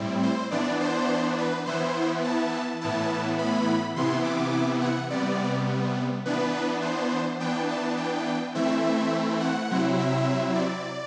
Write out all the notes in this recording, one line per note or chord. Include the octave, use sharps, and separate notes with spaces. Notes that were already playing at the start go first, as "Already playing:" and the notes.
Already playing: A2 G3 C4 E4
C5
E3 B3 D4 D5
C5
B4
E3 B3 E4 C5
A5
A2 E3 B3 E4 A5
B5
C3 E3 B3 E4 C6
D6
F#5
C3 G3 B3 D5
E3 B3 D4 B4
C5
E3 B3 D4 G5
A5
G5
E3 A3 C4 E4 E5
F#5
C3 F#3 C4 E4
E5
D5